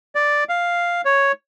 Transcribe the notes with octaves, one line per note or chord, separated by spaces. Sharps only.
D5
F5
C#5